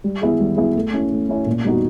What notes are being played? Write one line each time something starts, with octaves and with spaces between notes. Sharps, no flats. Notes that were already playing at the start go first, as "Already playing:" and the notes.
G3
B3 E4 G#4
G3
B3 E4 G#4
A3
C#4 E4
A3
C#4 E4
A#2
G3 B3 D#4 F#4